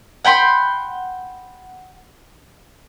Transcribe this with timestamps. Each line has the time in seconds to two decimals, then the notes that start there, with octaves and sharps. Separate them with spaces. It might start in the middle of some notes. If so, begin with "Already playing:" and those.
0.25 F#5 G5 B5 C6